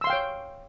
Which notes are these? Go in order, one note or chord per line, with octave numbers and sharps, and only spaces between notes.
C#5 F5 G5 C6 E6